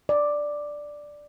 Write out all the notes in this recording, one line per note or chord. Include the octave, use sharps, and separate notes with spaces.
D5